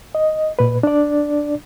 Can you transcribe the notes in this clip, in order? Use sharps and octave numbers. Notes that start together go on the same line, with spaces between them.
D#5
A#2 B4
D4 D5